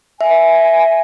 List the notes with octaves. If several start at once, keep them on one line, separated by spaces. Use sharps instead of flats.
E5 G#5